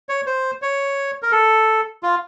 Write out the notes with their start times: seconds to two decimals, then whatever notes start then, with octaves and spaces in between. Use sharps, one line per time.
0.09 C#5
0.27 C5
0.62 C#5
1.22 A#4
1.32 A4
2.03 F4